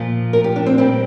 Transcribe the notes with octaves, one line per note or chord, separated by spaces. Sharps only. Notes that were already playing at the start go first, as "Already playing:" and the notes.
Already playing: A#2 F3
A#4
G4
D4
C4
A#2 G3 C4